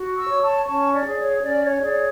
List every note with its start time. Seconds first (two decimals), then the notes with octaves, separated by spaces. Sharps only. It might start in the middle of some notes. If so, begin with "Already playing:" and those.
Already playing: F#4
0.16 C#6 E6
0.29 C#5
0.42 A5 C#6
0.67 C#4 A5 C#6
0.93 D5
1.05 G#4 C#5
1.18 C#5
1.43 C#4 D5
1.62 C#5
1.81 G#4 C#5 D5